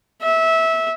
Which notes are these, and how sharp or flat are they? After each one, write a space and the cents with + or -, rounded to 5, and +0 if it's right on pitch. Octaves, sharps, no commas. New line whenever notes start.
E5 -20